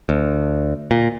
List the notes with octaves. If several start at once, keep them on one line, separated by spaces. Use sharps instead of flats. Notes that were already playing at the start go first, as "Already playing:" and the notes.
D2
A#2